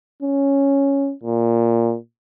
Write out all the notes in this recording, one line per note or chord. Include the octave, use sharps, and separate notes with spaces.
C#4
A#2